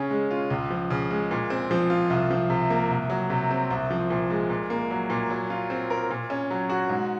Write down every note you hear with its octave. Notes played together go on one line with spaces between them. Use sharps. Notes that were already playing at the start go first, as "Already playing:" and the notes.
Already playing: C#3 C#4
G#3
F4
C#2
F3
C#3
G#3
A#2
C4
F3
F4
C2
F3
C3
A#3
C2
F#3
C3
C4
C2
F3
A#2
G#3
A#2
A#3
F#3
A#2
F#3
F4
C4
A#4
A#2
C#4
F#3
F#4
G#2